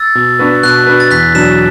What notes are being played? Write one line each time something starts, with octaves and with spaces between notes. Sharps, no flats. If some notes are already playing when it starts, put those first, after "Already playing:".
Already playing: E6 A6
B2
B3 D4 F#4 B4
B2 F#6
B3 D4 F#4 B4
A6
E2 F#6 B6
B2 F#3 D4 B6 E7